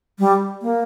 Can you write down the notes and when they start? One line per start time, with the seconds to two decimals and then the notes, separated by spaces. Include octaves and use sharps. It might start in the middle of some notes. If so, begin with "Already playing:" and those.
0.19 G3
0.62 A#3